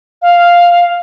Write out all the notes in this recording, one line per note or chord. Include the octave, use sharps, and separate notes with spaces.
F5